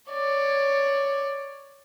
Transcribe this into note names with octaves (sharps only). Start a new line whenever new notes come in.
C#5 D5